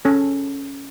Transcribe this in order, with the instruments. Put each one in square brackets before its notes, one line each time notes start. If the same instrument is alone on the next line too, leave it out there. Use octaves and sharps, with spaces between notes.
[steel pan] C#4 A4